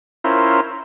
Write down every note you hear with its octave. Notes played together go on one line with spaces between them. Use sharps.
C#4 E4 F4 A#4 C5